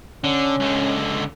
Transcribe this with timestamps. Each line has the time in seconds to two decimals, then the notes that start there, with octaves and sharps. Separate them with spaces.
0.24 D3 C#4
0.60 C#2 D3